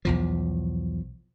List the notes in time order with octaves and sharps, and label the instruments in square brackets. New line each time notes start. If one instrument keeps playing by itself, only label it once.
[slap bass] B1 E2 F3